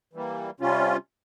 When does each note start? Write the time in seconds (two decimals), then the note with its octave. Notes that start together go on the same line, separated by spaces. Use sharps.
0.13 E3 G3 A#3
0.60 C3 G3 C#4 F4